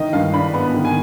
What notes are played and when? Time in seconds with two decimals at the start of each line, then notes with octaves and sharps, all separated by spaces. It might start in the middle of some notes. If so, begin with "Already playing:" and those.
Already playing: D#3 D#5
0.13 G2 F5
0.33 D4 B5
0.54 B3 B5
0.74 D#3
0.85 G#5